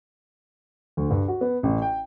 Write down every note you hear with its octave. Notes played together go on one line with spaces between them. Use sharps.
D2
G2
F#4
B3
A1
G5